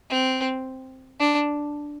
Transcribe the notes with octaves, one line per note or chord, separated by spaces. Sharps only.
C4
D4